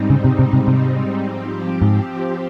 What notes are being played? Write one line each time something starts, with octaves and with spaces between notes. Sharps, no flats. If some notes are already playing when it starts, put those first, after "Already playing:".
Already playing: G#2 G3 C4 D#4
C#3
C3
C3
C3
C3
F3 C4 G4
G#2